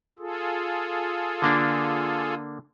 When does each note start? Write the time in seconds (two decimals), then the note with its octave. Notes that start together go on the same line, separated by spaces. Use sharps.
0.19 F4 G#4 A4
1.42 D3 A#3 D4